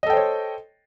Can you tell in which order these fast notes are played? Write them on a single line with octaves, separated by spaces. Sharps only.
D#5 A4 G5 C5 C#5